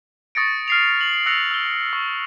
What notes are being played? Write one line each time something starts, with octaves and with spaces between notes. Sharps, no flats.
C#6 D#6 A6 A#6 C#7 D7
F6 C7 F7
F#7
E6 F#6 A#6 C#7 D7 F7
E6 G7
C#6